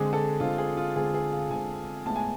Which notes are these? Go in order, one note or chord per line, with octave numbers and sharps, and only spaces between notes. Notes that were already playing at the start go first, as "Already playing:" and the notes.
Already playing: D3 G#3 C4 G#4
A4
D3 G#3 C4 F4
G#4
F4
D3 G#3 C4 G#4
G#4
F5
D3 G#3 C4 G#5
A2 G#3 B3 A5
G#5